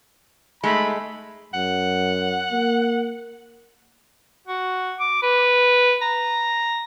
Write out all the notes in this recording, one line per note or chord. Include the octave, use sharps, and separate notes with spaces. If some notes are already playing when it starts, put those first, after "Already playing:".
G#3 A3 D#4 B5
F#2 F#5
A#3
F#4
D6
B4
A#5